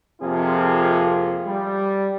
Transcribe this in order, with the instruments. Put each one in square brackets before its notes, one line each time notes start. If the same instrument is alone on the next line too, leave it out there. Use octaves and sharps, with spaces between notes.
[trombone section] F2 C3 F3 A#3 F4 G#4
G3